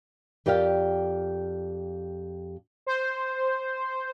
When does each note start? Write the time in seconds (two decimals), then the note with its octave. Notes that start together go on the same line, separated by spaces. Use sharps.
0.46 F2 G4 A#4 D5 F5 G5
2.87 C5